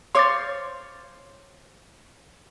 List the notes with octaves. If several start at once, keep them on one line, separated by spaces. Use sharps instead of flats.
C5 C#5 F5 C6 D6 A6